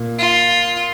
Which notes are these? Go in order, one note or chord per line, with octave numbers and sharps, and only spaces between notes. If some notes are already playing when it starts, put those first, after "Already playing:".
Already playing: A#2
F4